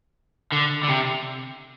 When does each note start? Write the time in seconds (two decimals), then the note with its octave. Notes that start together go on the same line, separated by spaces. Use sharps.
0.52 D3
0.83 D3
0.89 C3